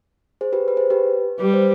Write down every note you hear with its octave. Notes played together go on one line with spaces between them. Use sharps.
G#4 C5
G4 B4
B4
G#4 C5
G4 B4
G3 B4
C5